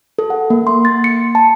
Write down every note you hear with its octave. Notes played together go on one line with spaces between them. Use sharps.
A4
F#5
A#3
C6
A6
C#7
A5